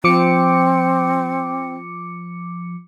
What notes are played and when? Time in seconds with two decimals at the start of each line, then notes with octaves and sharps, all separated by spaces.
0.04 F3 C4 D6 C#7